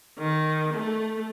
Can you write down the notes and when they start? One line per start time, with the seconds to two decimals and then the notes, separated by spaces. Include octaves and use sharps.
0.18 D#3
0.73 A3